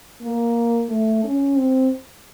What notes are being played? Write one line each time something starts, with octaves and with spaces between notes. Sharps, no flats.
A#3
A3
C#4
C4